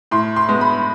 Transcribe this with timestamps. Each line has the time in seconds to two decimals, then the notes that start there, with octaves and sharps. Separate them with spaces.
0.11 A2 C6
0.36 C6
0.49 G#3 B3
0.61 B5